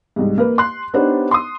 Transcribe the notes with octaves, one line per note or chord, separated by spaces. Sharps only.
C2 G#2
A#3 B4
C6 F#6
B3 D4 D#4 G4 C5 C#5
C6 D#6